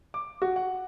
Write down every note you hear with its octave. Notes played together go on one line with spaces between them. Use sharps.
D6
F#4
F#5